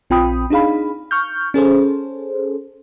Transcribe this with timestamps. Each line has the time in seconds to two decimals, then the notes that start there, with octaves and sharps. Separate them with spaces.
0.10 A#1 C4 F4 G5 B5 D#6
0.50 D4 D#4 G#4 F5 B5
1.11 C#6 F6 G6
1.54 C#4 G#4 A4 C5